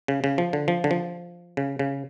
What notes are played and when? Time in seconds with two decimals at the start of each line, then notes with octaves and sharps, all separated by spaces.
0.08 C#3
0.24 C#3
0.38 F3
0.53 D3
0.68 F3
0.84 D3
0.91 F3
1.57 C#3
1.79 C#3